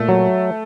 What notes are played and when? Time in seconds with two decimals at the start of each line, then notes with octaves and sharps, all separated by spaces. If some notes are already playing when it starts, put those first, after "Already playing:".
Already playing: A#2 A3
0.09 F#3